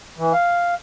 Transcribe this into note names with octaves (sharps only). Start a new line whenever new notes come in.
E3
F5